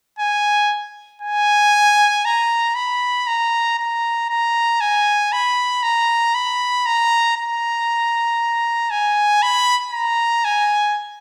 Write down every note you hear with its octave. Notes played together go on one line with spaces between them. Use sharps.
G#5
G#5
A#5
B5
A#5
A#5
A#5
G#5
B5
A#5
B5
A#5
A#5
G#5
B5
A#5
G#5